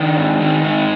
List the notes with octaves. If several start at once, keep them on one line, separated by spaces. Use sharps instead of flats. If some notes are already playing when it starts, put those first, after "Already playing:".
Already playing: D#3 D4
G#2
D#3
G#2 D#4